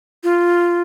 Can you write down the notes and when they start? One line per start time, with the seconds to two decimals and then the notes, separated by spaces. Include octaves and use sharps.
0.24 F4